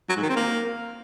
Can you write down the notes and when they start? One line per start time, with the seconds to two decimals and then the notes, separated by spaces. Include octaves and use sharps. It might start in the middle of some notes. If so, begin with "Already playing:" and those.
0.09 F#3
0.16 G#2
0.23 D#3
0.29 C4
0.36 A#3